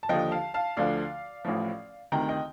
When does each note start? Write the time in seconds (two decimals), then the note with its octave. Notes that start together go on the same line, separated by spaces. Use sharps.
0.03 A5
0.09 D#2 D3 F3 D#5 G5
0.31 F5 A5
0.54 F5 A5
0.77 D2 D3 F3 D5 F5
1.45 A1 A2 F3
2.12 D2 C3 D#3 G5 A#5
2.29 D#5 G5